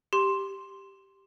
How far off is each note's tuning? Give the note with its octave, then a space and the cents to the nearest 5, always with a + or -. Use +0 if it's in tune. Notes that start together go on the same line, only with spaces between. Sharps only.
G4 +0 C6 +0